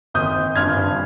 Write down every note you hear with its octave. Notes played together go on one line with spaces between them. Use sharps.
G#1 D#6 G6
G#1
G2 F6 G#6
G2